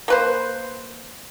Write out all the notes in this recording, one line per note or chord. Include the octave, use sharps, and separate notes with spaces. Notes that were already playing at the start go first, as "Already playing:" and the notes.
A#3 B4 C5